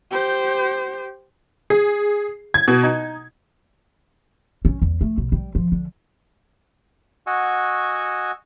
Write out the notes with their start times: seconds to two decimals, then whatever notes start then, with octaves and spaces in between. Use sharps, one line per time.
0.11 G4 C5
1.70 G#4
2.54 G#6
2.68 B2
2.83 D#4
4.65 C#4
4.82 E2
5.01 A3
5.18 B1
5.32 G3
5.55 F3
5.72 D3
7.27 F#4 D#5 F#5 G#5 C#6 E6